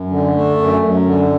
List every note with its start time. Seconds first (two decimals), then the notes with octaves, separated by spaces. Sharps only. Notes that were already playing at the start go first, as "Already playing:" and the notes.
Already playing: F#2
0.10 D3
0.35 A3
0.58 F#2
0.81 F#2
1.05 D3